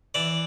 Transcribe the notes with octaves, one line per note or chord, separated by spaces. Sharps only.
E3 D5